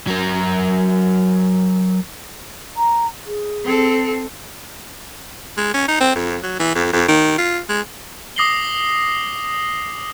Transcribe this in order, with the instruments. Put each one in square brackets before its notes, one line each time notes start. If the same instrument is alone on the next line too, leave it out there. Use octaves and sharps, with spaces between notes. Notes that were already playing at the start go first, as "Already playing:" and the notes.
[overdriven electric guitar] F#3 A#4
[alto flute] A#5
G#4
[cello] C4 A4
[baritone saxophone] G#3
C#4
D#4
C4
F2
F#3
E3
F2
F2
D#3
F4
G#3
[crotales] D6 D#6 A#6 C7 F#7 G7